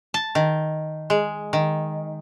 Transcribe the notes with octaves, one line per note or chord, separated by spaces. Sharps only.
A5
D#3
G#3
D#3